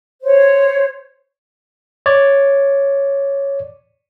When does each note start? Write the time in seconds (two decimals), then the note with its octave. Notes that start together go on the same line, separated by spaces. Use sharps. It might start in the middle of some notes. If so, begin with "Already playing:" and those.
0.23 C5 C#5
2.06 C#5 D5